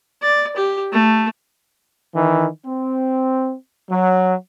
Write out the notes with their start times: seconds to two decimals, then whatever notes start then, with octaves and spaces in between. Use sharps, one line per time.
0.22 D5
0.56 G4
0.92 A3
2.15 D#3 E3
2.66 C4
3.90 F#3